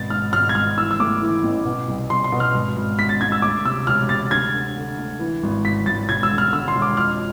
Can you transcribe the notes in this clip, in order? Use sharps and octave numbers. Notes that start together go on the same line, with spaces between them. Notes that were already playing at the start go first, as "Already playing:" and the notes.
Already playing: G#1 B2 A6
G#2 F6
G#1 F6
G#6
G#1 F6
E3 E6
E6
A2 D6
E3
A1
B2
C2
C2 C6
C6
B2
F6
G#1
G#1
G#2 B6
A6
G#2 G#6
E6
D2 D6
C3 E6
E1 F6
C3 A6
D2 G#6
D3
D3
D2
E3
G#1
G#1 B6
G#1 A6
E1 G#6
E6
D3
F6
D3 E6
C6
E1
D6
F2 F6